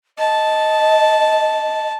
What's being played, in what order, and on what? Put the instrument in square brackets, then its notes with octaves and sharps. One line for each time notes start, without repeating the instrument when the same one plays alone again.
[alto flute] D#5 [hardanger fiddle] A5